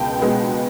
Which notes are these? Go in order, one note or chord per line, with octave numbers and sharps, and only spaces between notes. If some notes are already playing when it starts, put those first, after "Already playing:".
Already playing: C#2 B2 G#3 B3 G5 A5
B2 G#3 B3